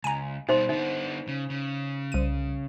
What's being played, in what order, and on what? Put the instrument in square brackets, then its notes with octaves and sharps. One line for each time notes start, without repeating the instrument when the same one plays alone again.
[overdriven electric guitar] C#2 [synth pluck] G#5 A#5
[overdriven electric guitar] B2 G3 [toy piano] D#4 C5 C6
[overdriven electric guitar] D3 B3 [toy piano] D#4
[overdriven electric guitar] C#3
C#3
[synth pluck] C2 D#7